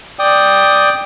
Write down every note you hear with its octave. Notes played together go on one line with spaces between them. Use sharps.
D5 G5 D#6